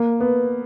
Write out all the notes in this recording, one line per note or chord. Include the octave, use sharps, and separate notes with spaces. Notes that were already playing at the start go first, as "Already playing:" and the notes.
Already playing: A#3
B3